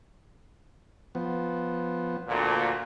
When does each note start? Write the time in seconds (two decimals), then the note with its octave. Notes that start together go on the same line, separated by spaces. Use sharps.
1.15 F3 B3
2.28 D2 A#2